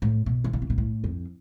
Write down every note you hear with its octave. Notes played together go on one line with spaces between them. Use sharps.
A2
B2
E3
D3
C3
B2
A2
F2